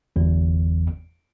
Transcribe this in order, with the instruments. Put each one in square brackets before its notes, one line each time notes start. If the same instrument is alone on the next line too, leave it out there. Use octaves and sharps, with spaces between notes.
[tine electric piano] G1 E2